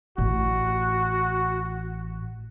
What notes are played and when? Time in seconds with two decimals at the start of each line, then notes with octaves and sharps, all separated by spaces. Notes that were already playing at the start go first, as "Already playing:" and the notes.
0.18 A1 F#4